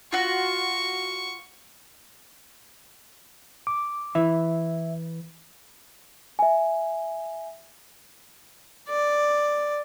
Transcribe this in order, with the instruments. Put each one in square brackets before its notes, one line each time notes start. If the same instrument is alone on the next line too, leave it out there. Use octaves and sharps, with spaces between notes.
[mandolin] F4 F#4 [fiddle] C#6
[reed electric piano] D6
[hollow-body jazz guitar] E3 [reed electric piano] E5
[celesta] E5 G#5
[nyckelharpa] D5